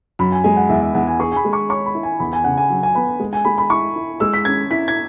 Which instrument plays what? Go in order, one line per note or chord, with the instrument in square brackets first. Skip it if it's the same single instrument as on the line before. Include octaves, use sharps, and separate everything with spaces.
[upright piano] F#2 [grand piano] B5
[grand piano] G#5
[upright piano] G#3 [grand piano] G#5
[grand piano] F#5
[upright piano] E2 [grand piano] E5
[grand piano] E5
[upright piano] E2 [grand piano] F#5
[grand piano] G#5
[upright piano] G#4 [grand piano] C#6
[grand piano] G#5
B5
[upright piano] G#3
[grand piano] C#6
[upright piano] C#5 [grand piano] C#6
[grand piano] B5
[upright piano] E4
[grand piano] G#5
[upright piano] E2 [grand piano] B5
[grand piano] G#5
[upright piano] C#3 [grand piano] F#5
[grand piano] G#5
[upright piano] F#3
[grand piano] G#5
[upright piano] B3 [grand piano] B5
[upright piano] G#3
[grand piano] G#5
[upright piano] G#3 [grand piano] B5
[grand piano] B5
[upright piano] E4 [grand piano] C#6
[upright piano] E4
[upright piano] G#3 [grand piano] E6
[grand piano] B6
[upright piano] C#4 [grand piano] G#6
[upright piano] E4 [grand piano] B6
[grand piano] G#6